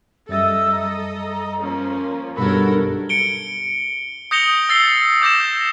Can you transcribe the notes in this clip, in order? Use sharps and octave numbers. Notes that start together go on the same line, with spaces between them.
F#2 G3 A4 D#5 E5 E6 A6
A#5
F3 A#3 C#4
B1 G2 B2 F#4 A4 A#4 C#5 B5
C#7 D7 G7
D#6 G6 A#6 C#7 F7 G7
E6 A6 C7 G7
D6 G6 A#6 E7